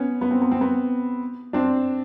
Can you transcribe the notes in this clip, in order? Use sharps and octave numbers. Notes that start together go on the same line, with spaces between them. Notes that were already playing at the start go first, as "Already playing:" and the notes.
Already playing: B3 C#4
B3
C4
B3
C4
B3
C4 D4